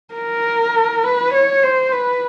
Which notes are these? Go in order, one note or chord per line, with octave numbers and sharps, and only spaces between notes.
A#4
B4
C#5
C5
B4